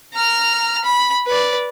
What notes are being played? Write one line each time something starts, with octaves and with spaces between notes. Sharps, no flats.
A#5 F6
B5
B4 D5